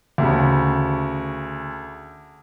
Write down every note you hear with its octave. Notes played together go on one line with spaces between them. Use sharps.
D2 C#3